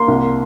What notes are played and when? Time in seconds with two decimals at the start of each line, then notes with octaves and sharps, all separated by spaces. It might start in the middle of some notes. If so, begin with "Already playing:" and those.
Already playing: A#3 C6
0.08 C2